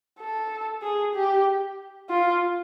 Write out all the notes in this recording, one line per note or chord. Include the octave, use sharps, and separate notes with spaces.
A4
G#4
G4
F4